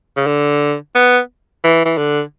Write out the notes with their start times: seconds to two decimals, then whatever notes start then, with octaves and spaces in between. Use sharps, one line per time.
0.17 C#3
0.27 D3
0.95 B3
1.64 E3
1.86 E3
1.98 D3